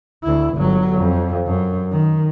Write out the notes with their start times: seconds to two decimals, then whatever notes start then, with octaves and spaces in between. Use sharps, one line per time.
0.24 D2 E4
0.56 G1 F#3
0.97 F2
1.46 F#2
1.91 D#3